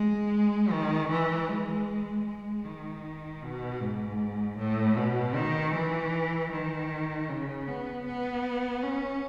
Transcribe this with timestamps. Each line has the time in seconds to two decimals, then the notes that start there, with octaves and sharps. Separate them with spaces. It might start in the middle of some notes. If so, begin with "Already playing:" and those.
Already playing: G#3
0.72 D#3
1.10 E3
1.49 G#3
2.26 G#3
2.64 D#3
3.42 B2
3.81 G#2
4.59 A2
4.97 B2
5.36 D#3
5.74 E3
6.52 D#3
7.30 C#3
7.68 B3
8.07 B3
8.84 C#4